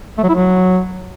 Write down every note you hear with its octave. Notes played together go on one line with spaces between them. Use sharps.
A3
F#3
E4
F#3